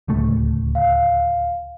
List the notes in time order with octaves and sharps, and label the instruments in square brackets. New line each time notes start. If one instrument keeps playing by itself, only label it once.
[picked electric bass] D1 C#2 A3
[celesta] F5